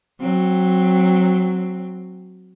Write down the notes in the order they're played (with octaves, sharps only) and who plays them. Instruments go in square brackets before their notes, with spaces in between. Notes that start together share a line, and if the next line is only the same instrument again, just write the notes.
[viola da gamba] F#3 C4